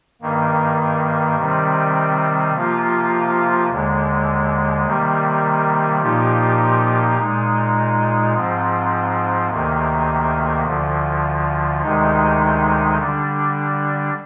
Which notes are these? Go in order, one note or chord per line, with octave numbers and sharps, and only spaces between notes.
G2 D#3 A#3
C3 D#3 G3 C4
C3 F3 A#3 F4
D#2 D3 G#3
C3 D#3 G3 A#3
A#2 F3 A#3 D#4 G4
A#2 G#3 D#4
G#2 F3 C4
D2 C3 D#3 A#3
D2 D3 F3
D2 C3 D#3 G#3 D#4
D3 G3 D4